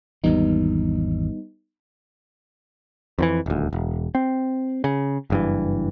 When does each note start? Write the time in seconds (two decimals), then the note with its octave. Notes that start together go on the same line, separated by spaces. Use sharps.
0.24 G#1 E2 E3 G3 B3 D#4
3.19 F2 D#3 E3
3.46 D#1 D2
3.73 E1
4.15 C4
4.84 C#3
5.30 F#1 G2 E3